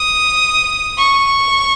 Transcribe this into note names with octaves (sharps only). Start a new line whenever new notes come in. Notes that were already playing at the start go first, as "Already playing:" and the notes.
Already playing: D#6
C#6